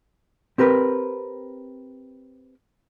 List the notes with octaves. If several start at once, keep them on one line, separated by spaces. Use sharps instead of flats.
C4 G4 A#4 B4